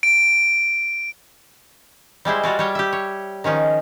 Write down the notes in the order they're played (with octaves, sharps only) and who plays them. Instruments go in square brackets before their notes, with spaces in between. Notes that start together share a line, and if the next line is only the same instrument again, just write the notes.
[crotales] D7
[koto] G3 G#3 E4 C5
G3 F4 F#4 D5
G3 C#5 G5
G4 E5
C#5
D#3 F3 C#4 D#4